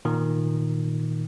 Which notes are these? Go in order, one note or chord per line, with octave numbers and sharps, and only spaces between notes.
A#2 D#3